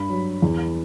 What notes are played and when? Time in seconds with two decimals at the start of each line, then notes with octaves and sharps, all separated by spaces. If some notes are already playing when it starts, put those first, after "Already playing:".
Already playing: G2 B5
0.10 F#3
0.42 E2